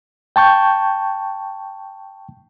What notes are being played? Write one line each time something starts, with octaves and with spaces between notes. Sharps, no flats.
G5 A5 C#6 G6